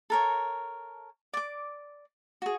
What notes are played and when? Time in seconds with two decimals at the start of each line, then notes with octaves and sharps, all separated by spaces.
0.10 A4 A#4 C#5
1.33 D5 D6
2.42 F#4 G#4